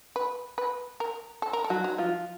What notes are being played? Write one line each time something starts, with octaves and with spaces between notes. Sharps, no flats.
B4
B4
A#4
A4
A#4
A4
F#3 F#4
D#4
F3 F4